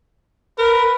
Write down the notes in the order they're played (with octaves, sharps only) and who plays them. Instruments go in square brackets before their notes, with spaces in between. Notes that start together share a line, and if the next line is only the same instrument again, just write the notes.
[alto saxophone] A#4 [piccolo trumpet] B4